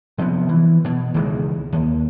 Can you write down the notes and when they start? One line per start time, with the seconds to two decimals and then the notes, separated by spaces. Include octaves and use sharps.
0.18 C3 F3 G#3 B3
0.49 E3
0.85 B2
1.14 C#2 D#3 E3 G#3
1.73 D#2